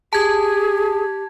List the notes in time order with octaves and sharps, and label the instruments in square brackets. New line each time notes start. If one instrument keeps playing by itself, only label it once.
[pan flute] G4 [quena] G#4 [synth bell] A5 G#6